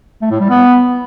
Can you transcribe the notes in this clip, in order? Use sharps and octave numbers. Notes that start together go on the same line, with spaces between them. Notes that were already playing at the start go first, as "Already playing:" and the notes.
A3
A2
G3
B3